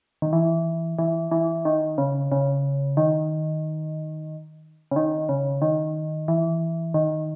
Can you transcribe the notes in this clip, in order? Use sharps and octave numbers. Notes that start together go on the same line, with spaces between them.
D#3
E3
E3
E3
D#3
C#3
C#3
D#3
C#3
D#3
C#3
D#3
E3
D#3